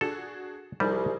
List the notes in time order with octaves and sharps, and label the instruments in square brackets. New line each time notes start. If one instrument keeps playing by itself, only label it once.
[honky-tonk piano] D4 F#4 G#4 [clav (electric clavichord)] A4
[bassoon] C2 [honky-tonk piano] F3 D#4 G#4 [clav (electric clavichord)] G3